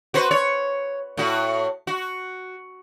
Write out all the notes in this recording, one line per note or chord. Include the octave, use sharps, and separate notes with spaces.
F#4 B4 C5
C#5
A2 F#4
F#4